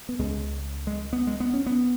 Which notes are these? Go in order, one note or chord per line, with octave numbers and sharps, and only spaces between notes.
B3
C#2 C#3 G#3
G#3
B3
G#3
B3
C#4
B3